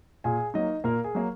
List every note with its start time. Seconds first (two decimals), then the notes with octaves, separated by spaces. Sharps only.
0.24 A#2 G#4 G#5
0.54 F#3 A#3 D#4 D#5
0.84 A#2 A#3 A#4
1.04 G#4
1.15 F#3 A#3